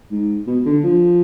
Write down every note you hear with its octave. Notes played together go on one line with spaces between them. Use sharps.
G#2
B2
D3
F3